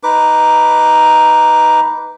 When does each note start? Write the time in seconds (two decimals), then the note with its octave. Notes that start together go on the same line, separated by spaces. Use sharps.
0.03 D#4 B4 D6